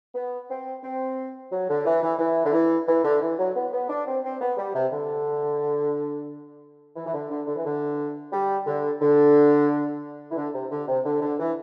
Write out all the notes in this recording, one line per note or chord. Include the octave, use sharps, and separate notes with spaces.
B3
C4
C4
F#3
D3
E3
E3
E3
D3
E3
E3
D3
E3
F#3
B3
B3
D4
C4
C4
B3
G3
C3
D3
E3
E3
D3
D3
D3
E3
D3
G3
D3
D3
E3
D3
C3
D3
C3
D3
D3
E3